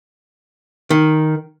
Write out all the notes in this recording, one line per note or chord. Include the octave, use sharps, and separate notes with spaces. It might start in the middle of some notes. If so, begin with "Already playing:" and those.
D#3